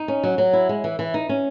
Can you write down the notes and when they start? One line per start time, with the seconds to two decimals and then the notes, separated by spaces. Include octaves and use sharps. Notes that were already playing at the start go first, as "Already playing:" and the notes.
Already playing: D#4
0.08 C#4
0.24 F#3
0.38 F#3
0.53 E4
0.69 G#3
0.84 E3
0.99 E3
1.14 D#4
1.29 C#4